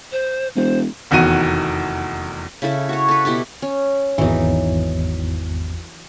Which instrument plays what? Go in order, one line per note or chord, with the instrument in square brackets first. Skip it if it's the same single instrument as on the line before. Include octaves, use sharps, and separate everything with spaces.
[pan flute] C5
[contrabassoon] E1 [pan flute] C5
[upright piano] F1 E2 D#3 F#4 D#7
[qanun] C#3 E4 A4 E5
F#4 C#5
A4 B4
B2 E4 G4 A4
C#4
[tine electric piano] G#1 E2 [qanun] E3 F#3 D#4